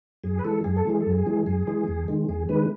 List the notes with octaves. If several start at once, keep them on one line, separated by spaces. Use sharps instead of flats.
F#2 G#4
B4
E3 G#3 A4
F#2 G#4
A4
E3 G#3 G#4
A4
F#2
G#4
E3 G#3
F#2 G#4
E3 G#3
E2
D#3 G#3
E2 G#4
D#3 G#3 B4